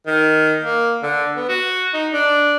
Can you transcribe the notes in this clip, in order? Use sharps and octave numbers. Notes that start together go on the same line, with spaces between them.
D#3
A#3
D3
B3
F#4
D#4
D4